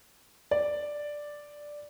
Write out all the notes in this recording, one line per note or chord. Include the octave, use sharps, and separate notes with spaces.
D5